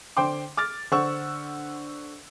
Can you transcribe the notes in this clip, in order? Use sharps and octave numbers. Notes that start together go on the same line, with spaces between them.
D3 C5 G5 C6 D6
D6 F6 A6
D3 C5 F#5 C#6 E6